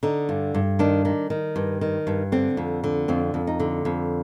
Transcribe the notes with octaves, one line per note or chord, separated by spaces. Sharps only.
D3 D#4
G2
G2
D#3 D4
D#3
D#3
G2
D#3
G2
D3 C4
F2
D3
F2 C4
F2
D#4
D3
F2